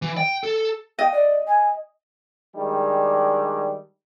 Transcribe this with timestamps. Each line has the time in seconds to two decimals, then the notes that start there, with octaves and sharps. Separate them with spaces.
0.02 E3
0.17 G5
0.43 A4
0.99 D#5 G5
1.12 D5
1.47 G#5
2.55 D#3 G3 G#3 D4